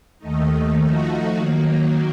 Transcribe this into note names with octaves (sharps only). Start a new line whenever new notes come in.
D#2 D#3 A3 D#4
F3 A3 D#4 F#4
D#3 F#3 A#3